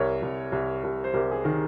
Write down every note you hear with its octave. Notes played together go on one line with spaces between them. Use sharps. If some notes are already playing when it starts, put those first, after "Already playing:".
Already playing: C2 A#4 C#5
C2
C2
C2
C5
C2 G4 A#4
G#4
D#3 A#4